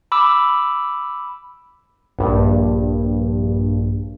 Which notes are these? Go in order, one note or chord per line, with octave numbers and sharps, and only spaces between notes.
B5 D6 E6
A#1 G2